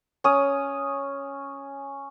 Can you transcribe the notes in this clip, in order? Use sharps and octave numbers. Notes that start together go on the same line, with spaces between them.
C#4 D#6